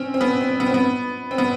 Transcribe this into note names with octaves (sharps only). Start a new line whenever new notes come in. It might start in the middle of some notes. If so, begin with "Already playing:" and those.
Already playing: C4 C#4
C4
B3
C4
B3
C4
B3
C4
B3